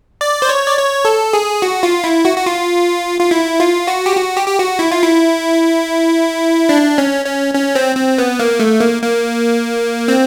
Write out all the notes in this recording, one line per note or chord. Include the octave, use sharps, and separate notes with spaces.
D5
C5
C#5
D5
C#5
A4
G#4
F#4
F4
E4
F#4
F#4
F4
F4
E4
F4
F#4
G4
F#4
G4
G4
F#4
E4
F4
E4
D4
C#4
C#4
C#4
C4
C4
B3
A#3
A3
A#3
A#3
C4